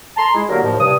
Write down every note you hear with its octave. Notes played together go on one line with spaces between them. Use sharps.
A5 A#5 C6
G#3 E4
D3 F#3 A#3 G4 A#4
D#2 A2 F3
G2 C3 D#6